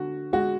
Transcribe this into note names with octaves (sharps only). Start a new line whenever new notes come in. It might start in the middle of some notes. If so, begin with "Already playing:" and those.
Already playing: D3 F#4
G#3 F#4